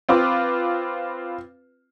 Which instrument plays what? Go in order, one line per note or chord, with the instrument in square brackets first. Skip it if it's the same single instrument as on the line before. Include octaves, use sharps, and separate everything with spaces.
[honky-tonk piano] C4 F4 B4 D6